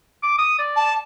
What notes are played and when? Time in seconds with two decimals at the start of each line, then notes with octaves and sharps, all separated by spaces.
0.23 D6
0.38 D#6
0.59 D5
0.76 A5